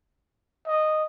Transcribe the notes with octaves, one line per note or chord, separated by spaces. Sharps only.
D#5